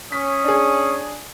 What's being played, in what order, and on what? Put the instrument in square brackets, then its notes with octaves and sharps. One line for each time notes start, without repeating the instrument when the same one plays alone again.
[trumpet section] C#4 D#6 [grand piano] B6
[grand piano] D4 G#4